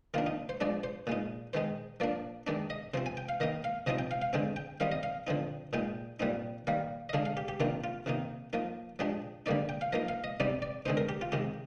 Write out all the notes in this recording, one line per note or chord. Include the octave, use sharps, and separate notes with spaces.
D#3 A#3 D4 F4
D#4
C5
F3 G#3 D4 D5
C5
A#2 G#3 D#4
D#3 G#3 D#4 C5
F3 A#3 D4 D5
D#3 G#3 D4 D5
D#5
C3 F3 C4 C5
G#5
G5
F5
D#3 A#3 D#4 D#5
F5
C3 F3 C4 D#4 D#5
G5
F5
F5
D3 G#3 C4 G5
G5
D#3 G3 C4 D#4 F5
D#5
F5
D3 F3 C4 D#4
A#2 G#3 D#4 G5
A#2 G3 C4 D#4
D#3 G3 A#3 F5
D#5
D3 G#3 D4 F5
F5
G4
G4
C3 D#3 A#3 D4 F4
F4
C3 D#3 A#3 D#4
F3 A#3 D#4
F3 G#3 D4 G4
D3 G3 A#3 D#4 D5
G5
F5
F3 A#3 D#4 D#5
F5
D#5
C3 G3 C4 D#4 D5
D5
D3 G#3 C4 D#4 C5
A#4
G4
F4
C3 D#3 G#3 G4